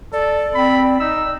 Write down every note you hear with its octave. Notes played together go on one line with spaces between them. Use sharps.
A4 D5
C4 B5
D#4 E6